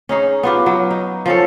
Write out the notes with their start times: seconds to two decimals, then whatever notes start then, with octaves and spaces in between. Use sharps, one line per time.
0.09 C#4 D#4 G#4
0.43 B3 F4 G4
0.66 F#3
0.91 D#4
1.26 F3 C#4 A4